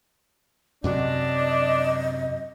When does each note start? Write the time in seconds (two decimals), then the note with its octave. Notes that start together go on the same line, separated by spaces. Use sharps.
0.84 F#2 C3 F#3 D4 D#5